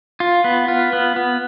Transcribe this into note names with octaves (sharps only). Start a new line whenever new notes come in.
F4
B3
F4
B3
B3